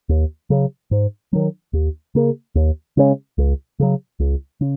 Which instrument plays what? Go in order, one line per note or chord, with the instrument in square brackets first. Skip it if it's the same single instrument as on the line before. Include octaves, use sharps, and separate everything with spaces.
[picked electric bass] D#2
C#3 F#3
G#2
D#3 F#3
D#2
C#3 A#3
D#2
C#3 G#3 C#4
C#2
C#3 F#3
C#2
C#3